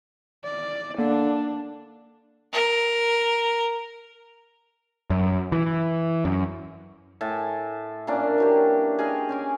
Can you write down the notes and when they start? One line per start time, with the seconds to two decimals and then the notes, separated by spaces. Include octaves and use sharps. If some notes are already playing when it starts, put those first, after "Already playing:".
0.44 D5
0.98 D3 A#3 D4
2.53 A#4
5.10 F#2
5.52 E3
6.25 F#2
7.21 A2 E5 G#5 A5
8.07 A#2 A#3 C#4 D4
8.38 E3 F#3 G4
8.99 G#4 D#5 F5 G5
9.29 C#4 G#5 D6